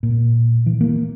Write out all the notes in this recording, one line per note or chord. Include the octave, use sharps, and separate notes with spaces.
A#2
E3
A#3